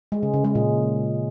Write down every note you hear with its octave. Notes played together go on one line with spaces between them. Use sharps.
G#3
C#3
C#3
G#3
A#2